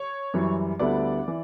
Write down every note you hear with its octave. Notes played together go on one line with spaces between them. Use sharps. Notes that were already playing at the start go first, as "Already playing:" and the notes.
Already playing: C#5
F#2 E3 G3
D2 D3 G3 B3 E4 D5
E3